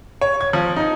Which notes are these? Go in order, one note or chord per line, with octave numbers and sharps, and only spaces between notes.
C#5
G#6
F3
D#4